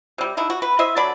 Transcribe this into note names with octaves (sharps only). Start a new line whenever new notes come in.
C3 G3
D3 D#4 E4
F#4
B4
E4 C5 D#5 E5
D3 F#3 D5 B5